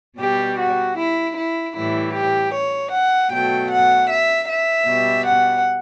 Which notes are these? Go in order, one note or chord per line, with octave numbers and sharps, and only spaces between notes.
B2 G3 G4
F#4
E4
E4
A2 E3 G3 E4
G4
C#5
F#5
B2 F#3 A3 G5
F#5
E5
E5
B2 G3
F#5